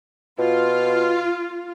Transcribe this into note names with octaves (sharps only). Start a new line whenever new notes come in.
B2 F4